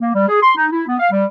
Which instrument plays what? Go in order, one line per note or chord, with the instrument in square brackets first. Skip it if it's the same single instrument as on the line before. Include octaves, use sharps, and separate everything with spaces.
[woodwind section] A#3
G3
G#4
C6
D#4
E4
B3
F5
G3